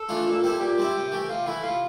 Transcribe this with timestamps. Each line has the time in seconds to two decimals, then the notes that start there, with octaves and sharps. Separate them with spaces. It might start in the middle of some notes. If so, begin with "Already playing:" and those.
Already playing: A4
0.09 E3 A3 D4 F4
0.27 A#2
0.43 G3 C4 E4
0.60 A#2 G4
0.78 G3 C4 E4
0.95 C3
1.12 E3 A3
1.29 C3 F4
1.46 E3 A3 E4
1.63 C3 F4